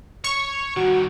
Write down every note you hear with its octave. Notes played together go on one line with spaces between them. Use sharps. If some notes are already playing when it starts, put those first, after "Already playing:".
C#5 C#6
G2 D#3 F#4